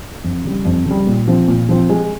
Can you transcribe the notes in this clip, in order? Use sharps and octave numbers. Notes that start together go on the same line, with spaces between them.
F2
C#3 G3
F2
C#3 G3
A#2
F3 C4
A#2
F3 C4
G#3